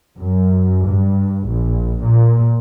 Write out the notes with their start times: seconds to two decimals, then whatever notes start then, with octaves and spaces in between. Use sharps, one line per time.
0.18 F#2
0.85 G2
1.48 A#1
2.02 A#2